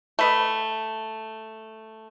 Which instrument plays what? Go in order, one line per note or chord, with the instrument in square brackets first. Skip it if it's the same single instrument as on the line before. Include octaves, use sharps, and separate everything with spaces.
[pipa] A3 B4 D#5